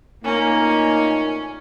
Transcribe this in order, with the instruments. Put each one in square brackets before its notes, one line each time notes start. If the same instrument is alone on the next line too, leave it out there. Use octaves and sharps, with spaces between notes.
[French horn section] A#2 A3 D#4 [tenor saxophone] A#3 [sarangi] C#4